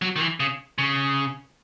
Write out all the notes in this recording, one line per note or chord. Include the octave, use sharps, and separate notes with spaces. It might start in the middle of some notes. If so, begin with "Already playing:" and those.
F#3
D#3
E3
C#3
C#3